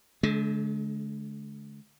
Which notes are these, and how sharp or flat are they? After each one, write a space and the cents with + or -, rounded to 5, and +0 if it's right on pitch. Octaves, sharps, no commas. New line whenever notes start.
D3 -25 G#3 +40